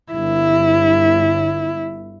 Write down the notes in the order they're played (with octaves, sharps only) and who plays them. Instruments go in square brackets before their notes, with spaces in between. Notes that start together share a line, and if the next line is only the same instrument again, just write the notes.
[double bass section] G1 [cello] E4